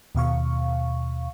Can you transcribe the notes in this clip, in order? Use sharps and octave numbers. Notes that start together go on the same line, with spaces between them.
D#2 B2 F5 C#6